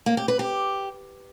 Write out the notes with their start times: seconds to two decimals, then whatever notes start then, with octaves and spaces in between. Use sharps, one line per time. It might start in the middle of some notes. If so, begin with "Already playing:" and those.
0.06 A#3
0.17 G4
0.28 B4
0.39 G4